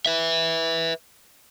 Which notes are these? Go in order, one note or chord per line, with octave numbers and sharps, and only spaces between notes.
B4 E5